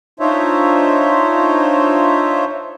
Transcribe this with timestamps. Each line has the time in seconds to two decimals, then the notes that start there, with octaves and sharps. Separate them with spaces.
0.20 D4 D#4 F4 C5 C#5 E5